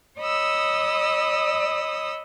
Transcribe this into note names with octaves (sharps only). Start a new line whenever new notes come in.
C#5 D#5 B5 D#6 E6